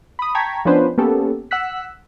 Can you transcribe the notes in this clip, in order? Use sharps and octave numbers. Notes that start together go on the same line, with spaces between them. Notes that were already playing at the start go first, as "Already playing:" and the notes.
B5 D#6
G5 A5 A#5 C#6 G#6 B6
F3 B3 C#4 D4 B4 C5
A#3 B3 C#4 G4 A4
F#5 E6 F#6 B6